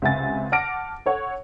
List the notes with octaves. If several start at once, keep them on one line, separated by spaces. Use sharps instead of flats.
C#2 C3 E5 F#5 G#5 A6
F#5 A5 D6 F6 A#6 D7
A4 C#5 F#5